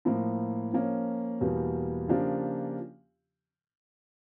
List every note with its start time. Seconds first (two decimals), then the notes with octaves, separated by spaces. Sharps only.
0.05 A2 F3 A#3
0.73 F3 A#3 C#4
1.41 E2 B2 G3 A#3
2.08 C#3 F3 A#3 D4 G4